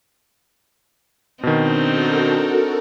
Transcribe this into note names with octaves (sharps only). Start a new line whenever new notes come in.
B2 D#3 C4 D4 D#4
F#4 A4 A#4